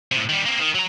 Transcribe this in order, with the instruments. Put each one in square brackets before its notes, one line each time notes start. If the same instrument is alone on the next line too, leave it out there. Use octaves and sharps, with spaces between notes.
[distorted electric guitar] A2 C3
D#3 G3
A#3 C4
D#3
F#3 A#5